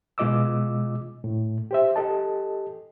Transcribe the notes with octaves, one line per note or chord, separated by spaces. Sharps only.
B2 G#3 F4 D#5 D6 E6
A2
G4 C5 E5
G4 A4 D#5 A5